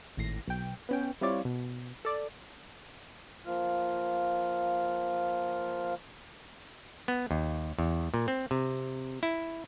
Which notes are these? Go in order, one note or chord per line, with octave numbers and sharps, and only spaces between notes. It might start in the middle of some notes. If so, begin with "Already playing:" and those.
G#1 A2 A#6 C7
B1 G5
B3 C#4 G5
G3 C4 E4 F4 C#5 D5
B2
A4 D5
F3 A#3 F4 F6
B3
D#2
E2
A#2
C4
C3
E4